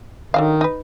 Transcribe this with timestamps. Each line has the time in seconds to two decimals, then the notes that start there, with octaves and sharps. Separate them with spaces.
0.34 D3 D#3 F#3 F5
0.61 D#4 B4